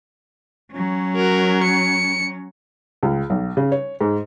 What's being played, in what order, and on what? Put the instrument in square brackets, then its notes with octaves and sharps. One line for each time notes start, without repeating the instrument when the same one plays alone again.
[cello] F#3 C#4
[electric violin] F#4 A#4
C#7
[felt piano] C#2
B1
C#3
C#5
G#2